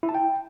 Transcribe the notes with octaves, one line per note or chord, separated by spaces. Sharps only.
E4
A5
G5